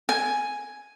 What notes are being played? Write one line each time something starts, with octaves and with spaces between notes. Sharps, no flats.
G#5